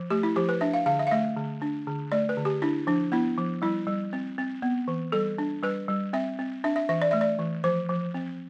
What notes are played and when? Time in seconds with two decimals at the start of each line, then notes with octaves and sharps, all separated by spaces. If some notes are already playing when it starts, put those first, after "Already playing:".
Already playing: F3
0.10 A3 G4
0.23 E4
0.36 F3 G4
0.49 B4
0.61 D4 E5
0.73 F5
0.86 D3 F5
0.99 E5
1.07 F5
1.11 A3 E5
1.36 D3
1.62 D4
1.87 D3
2.12 A3 D5
2.29 B4
2.37 D3
2.45 G4
2.62 D4 E4
2.87 F3 D4
3.12 B3 E4
3.38 F3
3.62 G3 E4
3.87 G3
4.13 C4
4.38 C4
4.62 B3
4.88 E3
5.12 G3 A4
5.38 D4
5.63 G3 B4
5.88 G3
6.13 C4 E5
6.39 C4
6.64 D4 E5
6.76 E5
6.89 E3 E5
7.02 D5
7.11 A3 E5
7.21 D5
7.39 E3
7.64 F3 C5
7.89 F3
8.14 C4